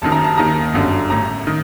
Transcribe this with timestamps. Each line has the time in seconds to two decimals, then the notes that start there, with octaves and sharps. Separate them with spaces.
0.02 F#1 F#2 D#3 A5
0.12 A#5
0.24 A5
0.37 D#2 D#3 A#5
0.74 G1 F#2 D3
1.10 A1 A2 A#5
1.47 D#3